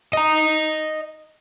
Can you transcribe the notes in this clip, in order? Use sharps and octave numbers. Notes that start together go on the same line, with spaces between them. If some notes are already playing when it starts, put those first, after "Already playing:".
D#5 A#5